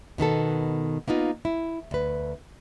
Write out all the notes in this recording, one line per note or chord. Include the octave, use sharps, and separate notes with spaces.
B2 D#3 B3 A4
A#3 B3 D#4 F4
E4
D2 B4